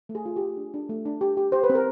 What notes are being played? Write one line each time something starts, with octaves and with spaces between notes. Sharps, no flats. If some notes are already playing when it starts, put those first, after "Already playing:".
A3
G#4
F4
A3 G4
D4
D4
A3
D4
G4
G4
G4 C5
B4
C4
A#4